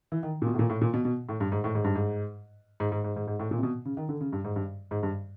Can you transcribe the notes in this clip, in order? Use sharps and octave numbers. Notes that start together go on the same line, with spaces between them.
E3
D#3
A#2
B2
A2
A#2
A2
A#2
B2
B2
A2
G2
G#2
A2
G#2
G2
G#2
G#2
G#2
G#2
G#2
G#2
A2
A#2
C3
B2
C#3
D#3
D3
C#3
G2
G#2
G2
G#2
G2